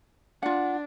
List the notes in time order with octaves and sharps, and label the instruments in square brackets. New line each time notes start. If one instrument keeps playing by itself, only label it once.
[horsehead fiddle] D4 [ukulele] F4 F#5